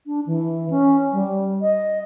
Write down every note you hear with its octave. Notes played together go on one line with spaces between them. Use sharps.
D4
E3
C#4
G3
D#5